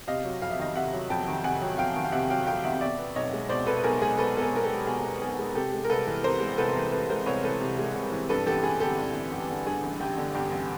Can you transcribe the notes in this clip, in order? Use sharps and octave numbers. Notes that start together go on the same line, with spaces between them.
C3 D#5 F5
F#3
F2 F5
E5
D#3 D#5 F5
C3 E5 F#5
F#3
F2 G5 A5
D#3
C3 F#5 G#5
F#3
F2 F5 G5
D#3
F5
C3 E5 F#5
F#3 F5 G5
F2 F5 G5
D#3 E5 F#5
B2 D5 E5
B3
B1 C#5 D#5
G#3
B2 C5 D5
B3 A4 B4
B4
B1 G#4 A#4
G#3 G#4 A#4
B2 A4 B4
B3 A4
G#4 A#4
B1 A#4
G4 A4
G#3
B2 G#4
B3
B1 G#4
G#3
C3 G4 A4
G#3
A#4
C2 A4 B4
E3
C3 A#4 C5
G#3
C2 A4 B4
E3
C3 A4 B4
G#3 A#4 C5
C2 B4 C#5
E3 A4 B4
C3
G#3
C2
E3
G2 A4 B4
A1 G4 A4
A1 G#4
D3 G4 A4
G2
A1
A1 G4
D3
G2 G#4
A1
A1 G4
D3
G2 G4
A1